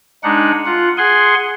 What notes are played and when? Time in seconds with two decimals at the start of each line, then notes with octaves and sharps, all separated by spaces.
0.23 G#3 D4 D#4 F#5
0.65 F4 F#5
0.98 G#4 F#5 G#5 C6